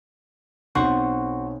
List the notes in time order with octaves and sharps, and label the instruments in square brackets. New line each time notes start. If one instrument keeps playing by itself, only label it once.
[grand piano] B1 C4 [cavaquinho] F#4 C5 C#6